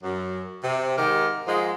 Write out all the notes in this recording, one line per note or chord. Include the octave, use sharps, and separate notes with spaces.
F#2
C3
G#2 D#3 G4 A#4
G#2 F3 G#3